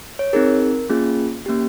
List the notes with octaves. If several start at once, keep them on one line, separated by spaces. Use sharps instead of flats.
C#5
C4 D#4 G#4 A#4
A#3 C#4 F4 G#4
A#3 C#4 G4